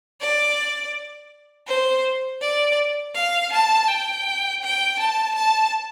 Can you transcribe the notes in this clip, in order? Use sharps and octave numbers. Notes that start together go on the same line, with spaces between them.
D5
C5
D5
F5
A5
G5
G5
A5
A5